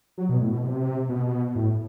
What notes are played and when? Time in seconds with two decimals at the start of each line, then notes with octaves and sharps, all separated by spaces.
0.18 F#3
0.29 B2
0.40 A2
0.52 B2
0.64 C3
1.09 B2
1.55 A2